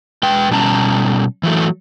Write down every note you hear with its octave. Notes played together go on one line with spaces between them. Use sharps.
G#3 B4 G5
B2 G3 C#4 A5 A#5
E3 F#3 A3